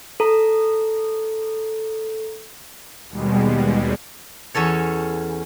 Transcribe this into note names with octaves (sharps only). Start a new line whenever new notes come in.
A4 A#5
D#2 B2 G3 G#3
E2 C#4 A4 C#5